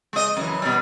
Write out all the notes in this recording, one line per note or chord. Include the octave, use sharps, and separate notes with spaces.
G#3 D#5
F#2 E3
B2 G3